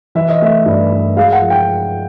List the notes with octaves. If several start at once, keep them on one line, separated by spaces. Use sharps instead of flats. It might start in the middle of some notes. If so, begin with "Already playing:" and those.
E3 E5
D#5
A3 E5
G2
G2
G#3 F5
F#5
F3
G5